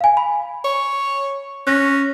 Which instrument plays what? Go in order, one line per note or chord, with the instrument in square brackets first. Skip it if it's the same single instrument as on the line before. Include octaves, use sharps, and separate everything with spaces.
[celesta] F5 G#5
B5
[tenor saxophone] C#5
[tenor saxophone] C#4 [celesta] F#6 A#6